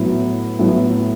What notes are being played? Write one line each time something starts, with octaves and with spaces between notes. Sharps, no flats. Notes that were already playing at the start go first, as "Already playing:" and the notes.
Already playing: A2 F#3 B3 E4
A2 F#3 B3 E4